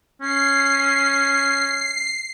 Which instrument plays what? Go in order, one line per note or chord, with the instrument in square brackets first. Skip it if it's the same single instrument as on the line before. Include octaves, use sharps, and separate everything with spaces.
[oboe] C#4 [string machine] C7